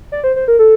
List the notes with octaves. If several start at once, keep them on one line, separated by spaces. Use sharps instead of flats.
D5
C5
C5
A#4
A4